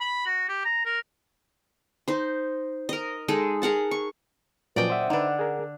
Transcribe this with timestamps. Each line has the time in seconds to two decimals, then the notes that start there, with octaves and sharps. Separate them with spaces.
0.01 B5
0.26 F#4
0.49 G4
0.65 A#5
0.85 A#4
2.08 D#4 C5
2.89 A#4 D#5
3.28 G#3 D#4 G#4 A4
3.62 G#4 A#4 F#5 A5
3.91 C#6
4.76 A#2 F3 F#3 C#4 B4 D5 D#5 G5
4.90 C5 E5 F#5
5.10 D3 D4 D#4 B4
5.39 G#4 A#4